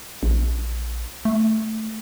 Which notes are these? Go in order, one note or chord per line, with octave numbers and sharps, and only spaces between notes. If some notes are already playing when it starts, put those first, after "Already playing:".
A#1
A3